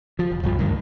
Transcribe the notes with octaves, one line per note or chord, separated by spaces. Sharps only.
F3
E1
C2 G2 F3
D2 G2 D#3